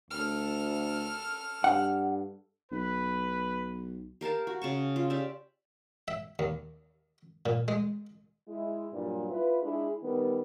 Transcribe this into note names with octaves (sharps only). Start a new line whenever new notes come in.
D2 A4 F6
G2 F#5
B1 B4
G4 A#4 F5 A5
F#4
C#3 A5 C#6
F4
G4 D5 E5
E5
D#2
A#2
G#3
G#3 E4
G2 A#2 F#3 G3
E4 F4 B4
G#3 D4 E4 G#4
D#3 G3 B3